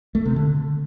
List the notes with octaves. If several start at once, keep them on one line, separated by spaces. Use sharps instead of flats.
A3
C3
D3